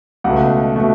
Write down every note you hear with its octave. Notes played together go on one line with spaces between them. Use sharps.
C#2 B2 A3 F#5
B2 A3